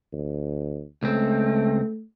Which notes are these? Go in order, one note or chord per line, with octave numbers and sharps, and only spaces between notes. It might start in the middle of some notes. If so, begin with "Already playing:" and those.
D2
C#2 A3 C4